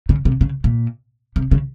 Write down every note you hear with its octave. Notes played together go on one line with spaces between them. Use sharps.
C#3
C3
C#3
A#2
C3
C#3